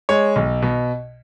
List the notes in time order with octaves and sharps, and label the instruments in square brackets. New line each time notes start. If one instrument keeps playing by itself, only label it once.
[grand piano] G#3 C#5
B1
B2